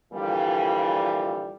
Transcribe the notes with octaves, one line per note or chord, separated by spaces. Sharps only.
A#2 D3 E3 F3 G3